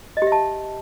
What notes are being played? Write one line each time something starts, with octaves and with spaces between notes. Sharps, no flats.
D#5
G4
E5
A5